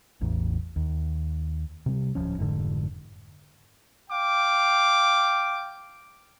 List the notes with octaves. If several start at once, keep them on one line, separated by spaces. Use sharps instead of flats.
A1 E2
D#2
C3 G3
D1 G#1 F3 C#4
F1 G#2 D3
F5 G5 D6